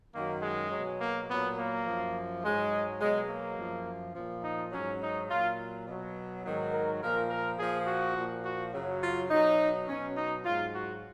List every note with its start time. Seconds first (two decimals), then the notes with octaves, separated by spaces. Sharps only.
0.14 F#2 D#3 F#3 A#3
0.42 G#3
0.71 B2 F#3
1.00 A#3
1.28 A#2 B3
1.33 F#3
1.57 A#3
1.86 F#2 F3
2.43 G#2 F#3 G#3
3.00 B2 F#3 G#3
3.29 A#3
3.58 F#2 F3
4.15 A#2 F3
4.43 D#4
4.71 G#2 F#3 C#4
5.01 D#4
5.29 A#2 F#3 F4
5.86 B2 F#3
6.44 G#2 D#3 F#3
6.72 A#4
7.01 A#2 F3 A#4
7.29 A#4
7.58 A#2 F3 G#4
7.87 F#4
8.16 A#2 F3
8.44 F#4
8.73 F#2 C#3 F#3
9.01 F4
9.29 B2 F#3 D#4
9.87 B2 F#3 C#4
10.16 D#4
10.45 G#2 F#3 F4
10.74 F#4